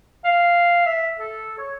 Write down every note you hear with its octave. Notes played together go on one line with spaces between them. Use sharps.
F5
E5
A4
C#5